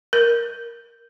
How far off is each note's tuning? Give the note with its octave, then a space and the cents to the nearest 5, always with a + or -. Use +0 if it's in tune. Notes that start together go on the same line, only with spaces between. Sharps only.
A#4 +5